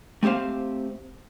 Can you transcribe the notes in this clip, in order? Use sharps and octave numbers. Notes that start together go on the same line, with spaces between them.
A3 C4 G4 C5 F5